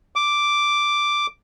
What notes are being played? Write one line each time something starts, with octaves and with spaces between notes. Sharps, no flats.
D6